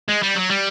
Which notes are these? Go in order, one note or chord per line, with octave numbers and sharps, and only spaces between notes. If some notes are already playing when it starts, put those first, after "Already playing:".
G#3
G3
F#3
G3